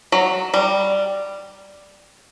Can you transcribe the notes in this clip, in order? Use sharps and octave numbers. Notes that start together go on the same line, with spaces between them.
F#3
G3